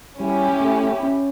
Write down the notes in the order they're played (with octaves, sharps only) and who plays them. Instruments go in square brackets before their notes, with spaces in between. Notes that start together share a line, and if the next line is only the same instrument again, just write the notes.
[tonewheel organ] G3 [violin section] C#4 E4 G4
[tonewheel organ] A3
C#4